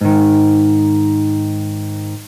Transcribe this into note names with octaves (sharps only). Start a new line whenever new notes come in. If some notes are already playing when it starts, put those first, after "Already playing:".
G#2 D#3